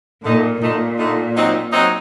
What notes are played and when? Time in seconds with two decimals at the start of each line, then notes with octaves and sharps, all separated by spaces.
0.24 A#2 D3 A3 D#4
0.61 A#2 D3 A3 D#4
0.98 D3 A3 D#4
1.36 F#3 C4 D#4
1.73 F#3 C4 D#4